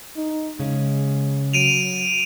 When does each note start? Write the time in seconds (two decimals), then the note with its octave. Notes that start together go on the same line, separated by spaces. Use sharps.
0.16 D#4
0.60 C#3 G#3
1.53 F#3 D7 D#7 F7